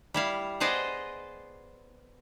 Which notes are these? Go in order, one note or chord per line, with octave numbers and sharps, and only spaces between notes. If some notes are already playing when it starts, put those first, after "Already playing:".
G3 E4 F5
B3 G#4 C5 D5 D#5